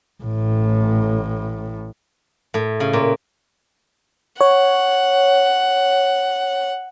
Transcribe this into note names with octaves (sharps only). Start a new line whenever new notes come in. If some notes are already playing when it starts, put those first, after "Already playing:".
A1 A2
A2
C#3
A#2
C#5 F#5